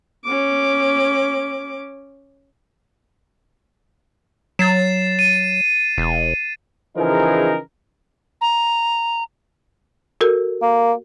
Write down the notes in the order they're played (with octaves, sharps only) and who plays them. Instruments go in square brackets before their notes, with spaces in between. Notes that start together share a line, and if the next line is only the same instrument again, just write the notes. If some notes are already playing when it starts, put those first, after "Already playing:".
[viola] C#4 D6
[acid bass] F#3 [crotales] A6 C7 E7
[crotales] D#7
[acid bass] E1
[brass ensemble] C#3 E3 F3 D#4 G#4 A#4
[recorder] A#5
[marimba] F#4 A4 A#4
[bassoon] A#3